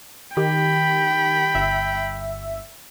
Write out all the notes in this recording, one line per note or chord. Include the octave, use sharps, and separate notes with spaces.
D#3 G4 G5 B5
G1 E5